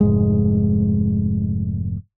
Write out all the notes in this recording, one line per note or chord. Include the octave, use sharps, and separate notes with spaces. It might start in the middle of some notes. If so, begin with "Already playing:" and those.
F1 G#2 G#3